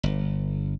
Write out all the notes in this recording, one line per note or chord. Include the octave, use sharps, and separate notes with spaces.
G1